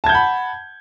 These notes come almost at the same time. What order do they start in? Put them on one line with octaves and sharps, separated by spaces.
A5 G#6 G6 F#5 B5